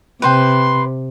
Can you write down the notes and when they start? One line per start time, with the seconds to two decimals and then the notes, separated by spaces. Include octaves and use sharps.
0.22 C3 B4 C5 G5 C6